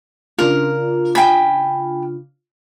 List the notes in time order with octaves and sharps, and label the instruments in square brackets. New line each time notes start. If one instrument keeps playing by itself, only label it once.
[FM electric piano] C#3 D4 F4 [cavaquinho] A#4
[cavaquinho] G5 G#5 B5